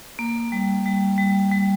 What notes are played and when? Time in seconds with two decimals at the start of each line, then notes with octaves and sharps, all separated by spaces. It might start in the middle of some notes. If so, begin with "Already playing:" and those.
0.19 A#3
0.52 G3
0.86 G3
1.18 G3
1.52 G3